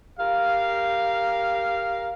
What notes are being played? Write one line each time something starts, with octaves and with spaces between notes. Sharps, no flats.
G4 A#4 F5